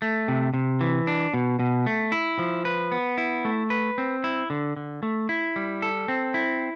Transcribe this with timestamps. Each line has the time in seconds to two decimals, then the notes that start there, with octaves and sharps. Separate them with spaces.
0.02 A3
0.28 C3
0.54 C3
0.81 E3
1.07 D4
1.34 B2
1.60 B2
1.86 A3
2.12 E4
2.39 F3
2.65 B4
2.92 B3
3.18 E4
3.45 A3
3.70 B4
3.98 C4
4.24 E4
4.50 D3
4.77 D3
5.03 A3
5.29 E4
5.56 G3
5.82 A4
6.08 C4
6.34 E4